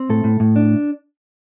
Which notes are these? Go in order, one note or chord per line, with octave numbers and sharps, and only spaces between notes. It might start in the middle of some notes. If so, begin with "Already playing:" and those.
Already playing: C4
A2 A4
A2
A2
D4